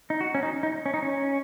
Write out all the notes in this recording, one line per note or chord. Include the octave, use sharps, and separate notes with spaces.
D#4
F#4
C#4
D#4
D#4
C#4
D#4
C#4